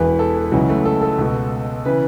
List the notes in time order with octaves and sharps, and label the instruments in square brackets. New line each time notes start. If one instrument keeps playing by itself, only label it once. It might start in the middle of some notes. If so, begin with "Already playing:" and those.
Already playing: [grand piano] E1 E2 E3 B4
A4
C#2 C#3 E3 F#3
A3
A4
A4
C#2 B2
C#3 E3 B4